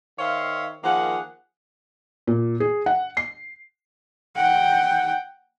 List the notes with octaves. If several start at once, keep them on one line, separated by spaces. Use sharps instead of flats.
D#3 C5 C#5 E5 F5
D#3 F3 A#3 G#4 F#5
A#2
G#4
F#5
C7
F#5 G5